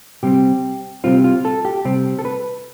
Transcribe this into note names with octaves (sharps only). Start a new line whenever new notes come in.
C3 G3 C4 G4
C3 G3 C4 F4
F4
A4
G4
C3 G3 C4
A4
B4